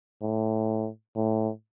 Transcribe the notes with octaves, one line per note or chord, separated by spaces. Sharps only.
A2
A2